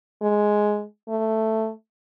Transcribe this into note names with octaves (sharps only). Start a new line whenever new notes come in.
G#3
A3